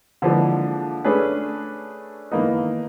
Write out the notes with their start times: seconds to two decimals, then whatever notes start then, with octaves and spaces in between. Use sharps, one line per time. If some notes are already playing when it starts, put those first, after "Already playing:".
0.22 D3 E3 F3 G#3 A#3 D4
1.05 A3 C#4 D4 G#4 B4
2.32 D#3 E3 A#3 B3 D#4